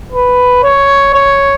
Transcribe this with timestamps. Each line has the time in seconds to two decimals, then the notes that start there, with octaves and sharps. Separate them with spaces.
0.12 B4
0.63 C#5
1.14 C#5